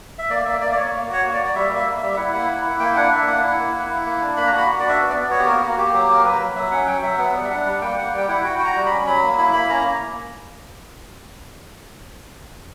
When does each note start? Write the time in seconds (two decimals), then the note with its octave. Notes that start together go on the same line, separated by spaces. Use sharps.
0.18 E5
0.30 A#3 D5
0.45 A#3 E5
0.61 A#3 D5
0.72 D5
0.76 A#3 C#5
0.92 A#3
1.08 F#4
1.13 C#5
1.23 A#3
1.33 D5
1.40 F#4
1.46 D5
1.55 G3 E5
1.71 A#3
1.76 E5
1.86 A#3
1.97 E5
2.02 G3
2.13 E5
2.17 E4 F#5
2.33 A#3
2.49 E4
2.64 E4
2.80 A#3 G5
2.96 D4 F#5
3.11 D4 E5
3.27 A#3 F#5
3.43 E4
3.59 A#3
3.74 E4
3.90 E4
4.06 A#3
4.21 D4
4.36 A#3 B5
4.47 A#5
4.52 F#4 B5
4.68 F#4
4.79 D4 D5
4.89 E5
5.00 B3
5.10 D5
5.15 B3
5.30 F#4 C#5
5.39 G4
5.46 A#3 A#4
5.62 A#3 F#4
5.78 A#3 G4
5.93 F#3 G4
6.09 A#3 A#4
6.24 F#3 B4
6.40 F#3
6.56 F#3 E5
6.71 C#4 F#5
6.87 F#3 G5
7.03 F#3 E5
7.18 B3 F#5
7.34 G3
7.45 E5
7.50 D4 F#5
7.66 G3
7.81 A#3 G5
7.97 A#3 F#5
8.12 G3
8.17 G5
8.28 E4 F#5
8.44 F#4 G5
8.58 F#4 G5
8.65 A#5
8.75 G3
8.86 B5
8.91 C#4
9.06 F#3 B5
9.23 A#3
9.38 E4 B5
9.53 A#3 B5
9.69 C#4 A#5